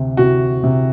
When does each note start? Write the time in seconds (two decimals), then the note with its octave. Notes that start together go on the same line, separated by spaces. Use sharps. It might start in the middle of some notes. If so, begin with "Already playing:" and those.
Already playing: D2 C3
0.17 C3 F#4
0.64 C3